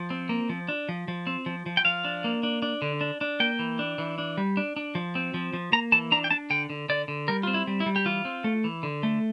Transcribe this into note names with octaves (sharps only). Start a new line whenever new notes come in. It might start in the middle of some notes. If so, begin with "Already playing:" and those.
Already playing: F3
C4
A#3
F3
D4
F3
F3
C4
F3
F3
G5
F3 F5
D4
A#3
D4
D4
D3
D4
D4
A#3 G5
E3
D4
E3
D4
G3
D4
D4
F3
C4
F3
F3
A#3 A#5
E3 A5
D4 A#5
G5
D4 A5
D3 G5
D3
D3 D5
D3
G3 A#4
C4 F4
E4
G3
E4
G3
G4
E3 F4
C4
A3
E3
D3
A3